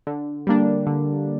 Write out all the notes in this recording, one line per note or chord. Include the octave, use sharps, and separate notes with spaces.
D3
G3 A#3 D4
D3